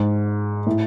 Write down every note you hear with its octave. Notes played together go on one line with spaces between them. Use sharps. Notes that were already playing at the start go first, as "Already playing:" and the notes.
Already playing: G#2
A2